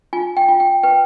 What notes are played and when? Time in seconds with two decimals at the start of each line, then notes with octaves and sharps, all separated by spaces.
0.13 F4 G#5
0.37 G5
0.48 F4
0.60 G5
0.83 B4 G5